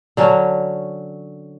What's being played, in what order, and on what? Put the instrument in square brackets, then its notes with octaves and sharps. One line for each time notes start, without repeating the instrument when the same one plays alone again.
[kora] D3 F#3 C#4